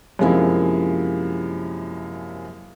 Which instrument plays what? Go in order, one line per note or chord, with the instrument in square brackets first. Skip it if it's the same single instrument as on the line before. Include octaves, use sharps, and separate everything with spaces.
[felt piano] F#2 C3 F3 G#3 A#3 E4